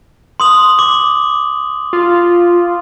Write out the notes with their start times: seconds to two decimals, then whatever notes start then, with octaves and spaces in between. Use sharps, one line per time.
0.40 C6 D#6 F#7
0.79 D6
1.93 F4